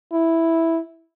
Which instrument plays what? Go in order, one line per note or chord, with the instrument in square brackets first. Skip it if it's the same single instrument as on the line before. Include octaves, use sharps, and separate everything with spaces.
[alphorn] E4